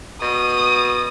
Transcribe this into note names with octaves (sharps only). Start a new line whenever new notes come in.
B2 D#6